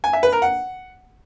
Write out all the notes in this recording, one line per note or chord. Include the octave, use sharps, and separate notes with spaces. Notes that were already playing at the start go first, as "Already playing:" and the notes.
G#5
E5
B4
A#4
F#5